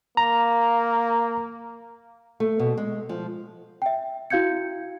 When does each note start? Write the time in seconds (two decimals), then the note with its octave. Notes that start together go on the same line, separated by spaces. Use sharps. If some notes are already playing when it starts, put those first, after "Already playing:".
0.17 A#3 A#5
2.40 A3
2.59 B2
2.78 G#3
3.09 F3
3.82 E5 G5
4.30 E4 F#4 F5 G6 G#6 C#7